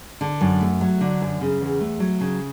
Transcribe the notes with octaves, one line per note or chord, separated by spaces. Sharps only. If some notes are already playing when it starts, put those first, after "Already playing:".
D3
F#2
A3
F#3
D3
F#2
C#3
E2
A3
F#3
C#3